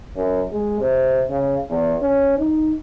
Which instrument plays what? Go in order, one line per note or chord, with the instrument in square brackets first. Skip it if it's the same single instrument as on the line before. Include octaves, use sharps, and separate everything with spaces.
[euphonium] F#2
G#3
C3
C#3
E2
C#4
D#4